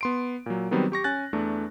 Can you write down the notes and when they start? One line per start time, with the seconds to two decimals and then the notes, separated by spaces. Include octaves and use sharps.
0.01 B3 C6 D7
0.46 A#2 F#3
0.71 D#3 F#3 G3 B3 C4
0.92 G4 C#6 A#6
1.04 C#4 G#5 F#6 A6
1.33 E2 A3 D4